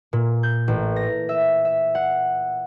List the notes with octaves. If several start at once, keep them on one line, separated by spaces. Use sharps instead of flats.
A#2
G6
A1
A#6
E5
E5
F#5